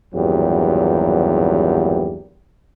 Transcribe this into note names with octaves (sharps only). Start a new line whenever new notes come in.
G#1 E2 G2 A#2 F#3 G4